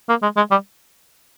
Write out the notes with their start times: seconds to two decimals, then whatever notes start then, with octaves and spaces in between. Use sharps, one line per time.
0.09 A#3
0.23 G#3
0.37 G#3
0.51 G3